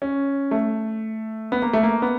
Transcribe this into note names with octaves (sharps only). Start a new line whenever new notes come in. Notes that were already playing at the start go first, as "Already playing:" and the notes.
C#4
A3
B3
A#3
A3
A#3
B3